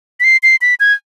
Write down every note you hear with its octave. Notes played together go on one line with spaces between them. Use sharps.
B6
C7
C7
B6
G#6